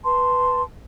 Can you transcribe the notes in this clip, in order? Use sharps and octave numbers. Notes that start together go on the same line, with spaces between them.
B4 A5 C6